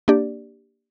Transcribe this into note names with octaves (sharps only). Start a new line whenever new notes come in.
A#3 D4 G4 D5